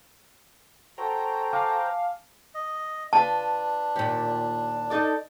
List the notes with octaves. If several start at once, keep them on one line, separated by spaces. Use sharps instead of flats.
F#4 A4 C5 G5 A#5
F5 G#5 A5 D6
D#5
D4 F4 B4 A5
D#2 A#2 G4
D#4 A4 D5